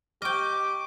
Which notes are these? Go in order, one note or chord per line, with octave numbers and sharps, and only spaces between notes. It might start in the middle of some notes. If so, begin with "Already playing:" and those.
G4 D#5 G5 C#6 D6 F6